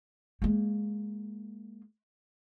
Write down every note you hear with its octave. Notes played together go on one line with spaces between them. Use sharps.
G#3 A#3